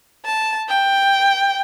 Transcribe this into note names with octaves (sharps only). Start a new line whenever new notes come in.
A5
G5